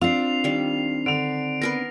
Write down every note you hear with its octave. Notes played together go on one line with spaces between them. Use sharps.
C4 D4 F4 C7 F7
D#3 G3
D3 D7 F7
B3 A#4 B4 A#6 D7